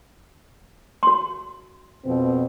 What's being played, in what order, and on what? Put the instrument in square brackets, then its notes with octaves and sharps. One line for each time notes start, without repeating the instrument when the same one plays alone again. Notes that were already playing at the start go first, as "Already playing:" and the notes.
[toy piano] F#4 C6
[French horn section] F2 B2 C4